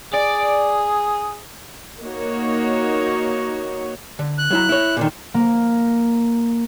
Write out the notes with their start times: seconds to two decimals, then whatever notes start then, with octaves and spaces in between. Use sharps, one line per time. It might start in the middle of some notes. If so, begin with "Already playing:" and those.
0.14 G#4 D5
2.02 A#3 D#4 F#4 C#5
4.19 D3
4.38 F#6
4.50 F#3 E4 A#5
4.69 E4 C#5
4.97 A#2 D3 D#3
5.34 A#3